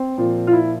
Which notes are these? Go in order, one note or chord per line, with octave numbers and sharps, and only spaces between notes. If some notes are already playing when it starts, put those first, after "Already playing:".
Already playing: C4
A#2 F3
F4
E4